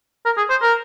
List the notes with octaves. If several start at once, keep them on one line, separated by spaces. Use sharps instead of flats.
A#4
G#4
C5
A#4